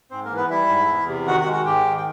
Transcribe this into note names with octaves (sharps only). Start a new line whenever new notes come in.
G#2 C4 C5
A#3 A#4
E3
B3 B4
G3 E4 E5
G#2
E2
C3
D#3 F#4 F#5
F#4 F#5
G#3
F#4 F#5
G#2 G4 G5
D#3
G5